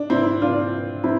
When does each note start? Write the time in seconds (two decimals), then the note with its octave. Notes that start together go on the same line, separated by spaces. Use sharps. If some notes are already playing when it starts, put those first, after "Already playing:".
Already playing: D4
0.10 C4 E4
0.42 D4 F4
1.04 C4 E4